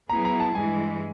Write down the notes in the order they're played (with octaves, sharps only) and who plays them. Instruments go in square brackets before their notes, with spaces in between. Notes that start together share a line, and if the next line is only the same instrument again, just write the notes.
[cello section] F#3 B3 E4 G#4 [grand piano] A#5
[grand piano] A#5
A5
[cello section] G2 E3 G#3 [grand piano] G#5